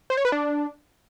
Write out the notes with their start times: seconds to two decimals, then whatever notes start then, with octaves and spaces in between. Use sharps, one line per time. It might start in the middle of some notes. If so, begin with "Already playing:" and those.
0.10 C5
0.17 C#5
0.25 B4
0.32 D4